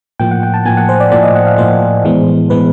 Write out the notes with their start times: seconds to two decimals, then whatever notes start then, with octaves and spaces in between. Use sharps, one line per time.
0.19 A2 F3 A#3 G5
0.31 F#5
0.43 G5
0.54 A5
0.65 A2 F3 A#3 G#5
0.77 F#5
0.89 C5
1.00 D5
1.11 A2 F3 A#3 D5
1.23 D#5
1.35 F#5
1.47 F5
1.58 A2 F3 A#3 C5
2.04 A2 E3 G#3 B3
2.50 A2 E3 G#3 B3 B4